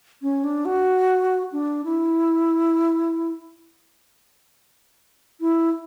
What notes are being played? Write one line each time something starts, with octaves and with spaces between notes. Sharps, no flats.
C#4
D4
F#4
D4
E4
E4